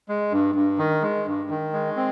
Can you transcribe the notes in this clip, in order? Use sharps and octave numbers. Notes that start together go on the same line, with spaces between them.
G#3
G2
G2
D#3
G#3
G2
D#3
G#3
C4